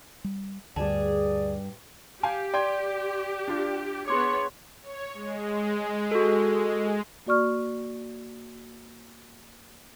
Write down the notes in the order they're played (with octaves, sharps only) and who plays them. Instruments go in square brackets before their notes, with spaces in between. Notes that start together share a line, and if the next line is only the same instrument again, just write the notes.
[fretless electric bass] G3
[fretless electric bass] D2 [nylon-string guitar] G2 A5 [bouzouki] G#4 [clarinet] D5
[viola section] G4 [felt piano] F5 G#5
[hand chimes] D5 [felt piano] G5 C6 G#6
[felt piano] D4 F4
[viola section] B3 C#5 [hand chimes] G#4 C6 D6
[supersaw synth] C#5
G#3
[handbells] F#4 A4
[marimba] A#3 F#4 D5 C#6 F6